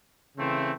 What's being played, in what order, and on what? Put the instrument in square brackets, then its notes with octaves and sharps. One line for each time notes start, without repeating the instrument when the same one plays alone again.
[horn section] C#3 E3 A3 C4